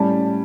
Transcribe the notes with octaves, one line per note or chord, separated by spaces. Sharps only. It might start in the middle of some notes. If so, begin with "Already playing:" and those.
Already playing: A2 G3 C#4 A5